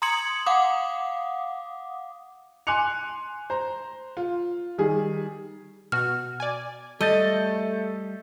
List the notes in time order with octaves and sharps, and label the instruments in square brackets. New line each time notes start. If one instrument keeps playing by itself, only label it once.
[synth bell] A#5 C6 D#6 G#6 C#7 F#7
F5 F#5 D6 D#6
[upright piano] G#5 C6 D6 F#6 C#7 F7
C5 A#5
F4
D#3 G3 G#4
[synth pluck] B2 F#4 [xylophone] F6
[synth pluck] D5 G#5
[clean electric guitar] G3 [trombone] A3 [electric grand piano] A4 G6 A6 [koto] D#5